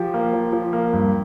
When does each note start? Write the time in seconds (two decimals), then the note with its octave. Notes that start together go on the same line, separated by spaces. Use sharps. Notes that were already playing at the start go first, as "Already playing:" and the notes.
Already playing: F3 G4
0.14 A#3
0.33 F3
0.53 F3
0.73 A#3
0.93 G2